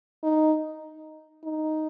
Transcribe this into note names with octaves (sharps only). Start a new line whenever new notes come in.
D#4
D#4